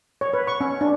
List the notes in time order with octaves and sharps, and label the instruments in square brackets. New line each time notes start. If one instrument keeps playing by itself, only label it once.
[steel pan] C#5
B4
C#6
C#4
D4